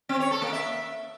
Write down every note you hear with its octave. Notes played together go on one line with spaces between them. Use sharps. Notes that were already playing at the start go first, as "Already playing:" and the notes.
C4
C#5
A4
A#3
E5